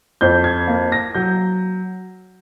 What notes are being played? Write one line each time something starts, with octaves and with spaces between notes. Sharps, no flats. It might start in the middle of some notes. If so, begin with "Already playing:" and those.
F2 G6
G#6
A#3
A#6
F#3 G6